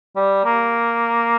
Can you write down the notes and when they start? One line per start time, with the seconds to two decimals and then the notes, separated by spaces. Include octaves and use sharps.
0.16 G3
0.45 A#3